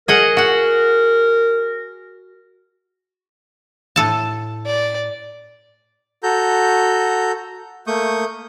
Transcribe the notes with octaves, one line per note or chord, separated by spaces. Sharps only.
G#4 A#4 D#5 F#5
F#4 F#5
A2 A4 A5
D5
F#4 A4 A#5 G6
A3 A#3 C#6 D#6 G6